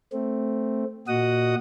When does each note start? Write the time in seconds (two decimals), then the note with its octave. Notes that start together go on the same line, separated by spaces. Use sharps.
0.13 A3 C4
1.08 A#2 F#4 D#5 F#5 D#6